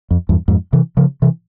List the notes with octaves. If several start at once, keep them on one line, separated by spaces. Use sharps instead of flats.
F2
E2 G2
F2 G#2
C3 E3
C#3 F3
C3 E3